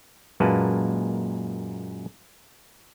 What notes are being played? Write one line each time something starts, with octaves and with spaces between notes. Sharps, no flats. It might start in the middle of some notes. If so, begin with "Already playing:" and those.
F#2 A#2 G#3 A#3 B4 A5